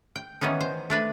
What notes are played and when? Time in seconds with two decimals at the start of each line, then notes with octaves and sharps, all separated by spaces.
0.16 G5
0.41 D#3 E3 B3 C#4 D#4
0.61 C5
0.90 A3 D4 B4